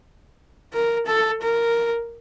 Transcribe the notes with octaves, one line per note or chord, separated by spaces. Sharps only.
A#4
A4
A#4